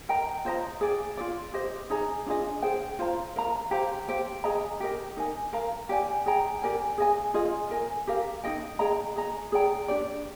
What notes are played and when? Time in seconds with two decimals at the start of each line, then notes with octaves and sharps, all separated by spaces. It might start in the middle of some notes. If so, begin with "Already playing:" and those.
0.09 A#4 D#5 G5 A#5
0.45 F4 C5 D#5 A#5
0.81 G#4 D5 G5
1.17 F4 G#4 D5
1.54 G4 C5 D#5
1.90 D#4 G#4 D#5 A#5
2.26 D4 F4 G#4 D#5
2.62 G#4 C5 G5
2.99 F4 C5 F5 A#5
3.36 A#4 F5 A#5
3.71 G4 C5 F5 A#5
4.08 G4 C5 G5
4.44 G#4 D#5 G5 A#5
4.80 G4 A#4 D#5
5.17 D#4 A#4 D#5 G#5
5.53 A#4 F5 A#5
5.89 G4 D5 G#5
6.26 G#4 D#5 G5 A#5
6.62 G4 A#4 D5 G#5
6.98 G#4 D#5 G#5
7.34 F4 G#4 D#5
7.71 A#4 D#5 G#5
8.07 G4 A#4 F5
8.44 D#4 G#4 D#5 G5
8.79 G#4 D#5 G5 A#5
9.16 G#4 D#5 A#5
9.52 G#4 D5 G5 A#5
9.88 D4 G4 D5